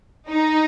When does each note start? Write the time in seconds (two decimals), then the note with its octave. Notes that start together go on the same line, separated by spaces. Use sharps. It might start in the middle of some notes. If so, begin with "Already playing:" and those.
0.28 D#4